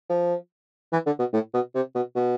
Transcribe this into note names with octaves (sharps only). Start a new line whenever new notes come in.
F3
E3
D3
B2
A2
B2
C3
B2
B2